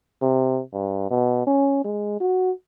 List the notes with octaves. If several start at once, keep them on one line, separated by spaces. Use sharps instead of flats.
C3
G2
B2
C#4
G#3
F#4